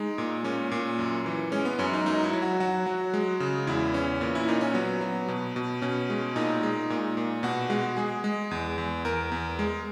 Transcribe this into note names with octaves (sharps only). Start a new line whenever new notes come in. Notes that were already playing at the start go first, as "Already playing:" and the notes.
Already playing: G#3 D#4
A#2
A#2 C#4
A#2
F#2
E3
G#3 C#4
B3
F#2 C#4
D#4
F#3 D#4
E4
F#3
F#4
F#3 F#4
F#3
G#3
C#3
E2 E4
E3 C#4
A#2
E4
A#2 D#4
C#4
F#3 B3
F#3
B2
B2
B2 C#4
G#3
A#2 D#4
G#3
A#2
A#2
B2 F#4
G#3 F#4
G#3 G#4
G#3
E2
E2
E2 A#4
E2
G#3